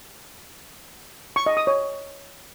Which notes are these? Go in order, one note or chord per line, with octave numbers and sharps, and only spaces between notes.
C#6
D#5
D#6
C#5